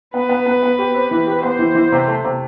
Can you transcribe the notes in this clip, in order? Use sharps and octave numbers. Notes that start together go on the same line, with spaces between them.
B3 B4
B3
B3
B3
G4
C4
E3
G4
B3 C5
E3
E3
C3
A3
C3